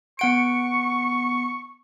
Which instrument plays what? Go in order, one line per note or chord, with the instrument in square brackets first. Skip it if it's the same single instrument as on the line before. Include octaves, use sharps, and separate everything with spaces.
[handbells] B3 F#5 D7 [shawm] C#6